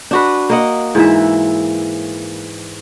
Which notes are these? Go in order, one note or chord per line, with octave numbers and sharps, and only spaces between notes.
D4 F#4 B4
A#3 D#5 F#5
G#2 E3 E5